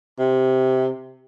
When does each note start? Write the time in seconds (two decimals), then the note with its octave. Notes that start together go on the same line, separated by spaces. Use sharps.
0.19 C3